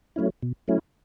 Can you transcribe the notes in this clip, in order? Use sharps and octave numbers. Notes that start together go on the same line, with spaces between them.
F#3 A3 C#4 E4
B2
F#3 A3 C#4 E4